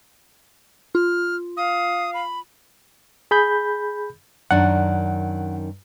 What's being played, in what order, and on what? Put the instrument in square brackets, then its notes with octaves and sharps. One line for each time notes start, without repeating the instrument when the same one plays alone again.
[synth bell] F4 [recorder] F6
[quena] F5 [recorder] D#6
[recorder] B5
[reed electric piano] G#4 B5 G6
[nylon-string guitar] F#2 D#3 D4 [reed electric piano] F#5